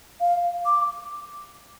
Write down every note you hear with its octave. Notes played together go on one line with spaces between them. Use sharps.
F5
D6